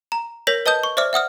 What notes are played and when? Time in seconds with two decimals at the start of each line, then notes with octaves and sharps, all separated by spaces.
0.12 A#5
0.47 A#4 C#5 G6 A#6 B6 F7
0.66 B4 D#5 A5 D#6 G6
0.83 C#6
0.97 C5 D5 E5 D6 F6
1.13 E5 F#5 D#6 F6